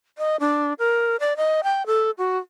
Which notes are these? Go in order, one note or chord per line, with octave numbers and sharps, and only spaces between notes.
D#5
D4
A#4
D5
D#5
G5
A4
F#4